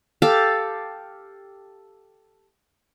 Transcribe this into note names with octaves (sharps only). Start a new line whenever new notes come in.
G4 A4 F5 A5